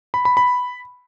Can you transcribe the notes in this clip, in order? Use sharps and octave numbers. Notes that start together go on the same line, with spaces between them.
B5
B5
B5